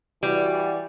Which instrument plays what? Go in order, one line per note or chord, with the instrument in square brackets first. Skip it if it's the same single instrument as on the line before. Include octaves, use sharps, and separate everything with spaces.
[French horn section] E3 F#4 D5 [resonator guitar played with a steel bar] G3